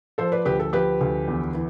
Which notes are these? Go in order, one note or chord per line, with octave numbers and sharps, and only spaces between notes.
F3 A4 C5
B4 D5
D2 G4 B4
A4
F3 G4 B4
D2
E2
E3